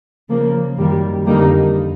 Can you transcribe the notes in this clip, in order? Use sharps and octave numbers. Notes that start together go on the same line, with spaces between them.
C#3 F3 A#3
F#2 D#3 G3 A#3
F2 D3 G3 A#3 D#4